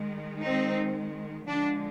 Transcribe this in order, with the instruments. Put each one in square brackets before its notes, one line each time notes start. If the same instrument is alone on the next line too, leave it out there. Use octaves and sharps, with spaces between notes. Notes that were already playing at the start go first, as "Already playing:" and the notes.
Already playing: [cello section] D#3 G#3
C4 D#4
D3 F3 G#3 D4